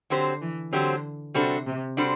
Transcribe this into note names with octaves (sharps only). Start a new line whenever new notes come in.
D3 F#3 C4 G4 C5
E3
D3 F#3 C4 G4 C5
C3 G3 D4 F#4 A4 C5
C3
G3 D4 F#4 A4 C5